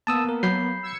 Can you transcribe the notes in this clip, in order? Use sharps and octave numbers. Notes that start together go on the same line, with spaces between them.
A#3 B3 A5 D#6 E6
A#4
F#3 B5 G6 C7
E6 G#6 C#7